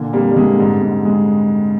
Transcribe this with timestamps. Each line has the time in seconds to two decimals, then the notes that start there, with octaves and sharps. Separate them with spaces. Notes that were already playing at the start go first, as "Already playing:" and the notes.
Already playing: A#2 D3
0.13 F2 G3 A#3
0.31 G3
0.36 D3 G#3
0.59 G#2 G3
0.82 G#2
1.05 G#3